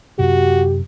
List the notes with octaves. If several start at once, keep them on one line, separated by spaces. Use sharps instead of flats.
F#2 C3 F#4 G4